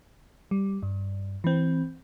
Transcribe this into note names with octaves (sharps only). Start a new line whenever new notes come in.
G3
G2
E3 C4